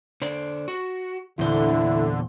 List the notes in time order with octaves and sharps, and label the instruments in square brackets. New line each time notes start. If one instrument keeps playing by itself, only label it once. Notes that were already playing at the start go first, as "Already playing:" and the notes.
[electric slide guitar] D3 C5 D5
F#4
[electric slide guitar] E2 A#2 C5 [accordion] D3 [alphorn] E4